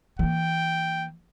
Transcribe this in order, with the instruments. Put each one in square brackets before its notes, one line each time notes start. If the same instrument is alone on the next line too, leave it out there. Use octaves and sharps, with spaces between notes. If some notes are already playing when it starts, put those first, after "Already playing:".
[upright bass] E3 A#3 [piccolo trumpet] G5